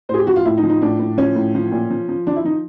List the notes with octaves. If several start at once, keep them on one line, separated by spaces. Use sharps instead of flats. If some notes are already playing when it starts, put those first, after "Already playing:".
A2 G#4 C5
G4
F3 F#4
F4
A2 E4
D#4
F3
D#4
A2 D4
A2
F3 C#4
A2
F3
A#2
F3
F3
F3 D4
E4
F3 D#4